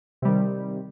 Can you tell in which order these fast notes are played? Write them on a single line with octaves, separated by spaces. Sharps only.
C3 G3 D#3